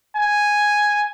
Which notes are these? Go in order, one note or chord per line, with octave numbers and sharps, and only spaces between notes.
G#5